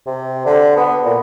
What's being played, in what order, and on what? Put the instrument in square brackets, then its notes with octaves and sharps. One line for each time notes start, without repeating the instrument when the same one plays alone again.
[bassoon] C3
D3
B3
A#2